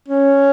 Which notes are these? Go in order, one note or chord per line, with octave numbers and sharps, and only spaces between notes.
C#4